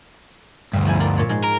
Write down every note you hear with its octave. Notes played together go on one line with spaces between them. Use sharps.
D2 G2
F3 E4 G#5
F4 A#4 D5
A#2 C#5 D5
G#2 G#3
A#4